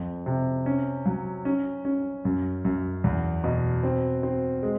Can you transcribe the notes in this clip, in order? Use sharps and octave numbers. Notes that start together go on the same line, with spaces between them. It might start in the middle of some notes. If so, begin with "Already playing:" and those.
Already playing: F2
C3
C#4
F#3
C#4
C#4
F#2
F#2
E2
B2
C4
C4
G#3